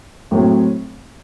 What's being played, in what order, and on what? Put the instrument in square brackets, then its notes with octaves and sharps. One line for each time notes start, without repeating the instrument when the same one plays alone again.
[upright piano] A2 F#3 C4